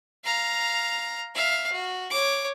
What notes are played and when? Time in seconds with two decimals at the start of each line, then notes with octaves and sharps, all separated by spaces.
0.24 F5 A#5
1.35 E5 F5
1.72 F#4
2.10 C#5 D6